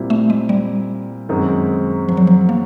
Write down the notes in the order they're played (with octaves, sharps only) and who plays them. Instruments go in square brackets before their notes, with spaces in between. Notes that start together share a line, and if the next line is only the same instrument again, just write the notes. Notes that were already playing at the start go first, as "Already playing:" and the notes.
Already playing: [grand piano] A#2 G3 C4 E4
[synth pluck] A3
G#3
G3
[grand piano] F#2 D#3 G#3 C4
[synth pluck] F3
F#3
F3
A#3